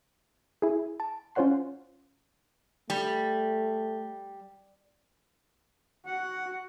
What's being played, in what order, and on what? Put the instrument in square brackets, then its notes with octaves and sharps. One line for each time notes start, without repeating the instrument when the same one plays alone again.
[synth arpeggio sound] E4 G#4
A5 D7
C#4 F4 C5 C#5 F#5 C6
[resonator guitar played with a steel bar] G3 [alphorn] A3
[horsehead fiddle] F#4 [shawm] F#5